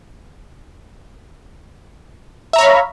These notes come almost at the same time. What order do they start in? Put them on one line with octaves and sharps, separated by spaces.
E5 A#5 C#5 B5 F5